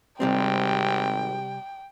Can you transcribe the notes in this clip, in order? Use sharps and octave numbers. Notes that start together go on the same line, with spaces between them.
G#1 C3 G3 C4 G5